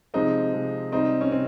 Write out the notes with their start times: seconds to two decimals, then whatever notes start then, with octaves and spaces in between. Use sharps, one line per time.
0.14 C3 F3 G#3 C4 D#4
0.53 C3 F3 G#3
0.92 C3 G3 C4 D#4
1.21 C#4
1.32 C3 C4